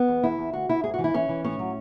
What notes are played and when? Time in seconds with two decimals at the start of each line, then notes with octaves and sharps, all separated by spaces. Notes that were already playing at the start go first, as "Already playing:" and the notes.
Already playing: B3
0.08 E2
0.23 E2 E4
0.38 E2
0.53 D2 F#4
0.69 D2 E4
0.84 G#2 G#4
0.94 E3 F#4
1.04 E4
1.14 E3 C#4
1.29 E3
1.44 A2 C#4
1.59 F#3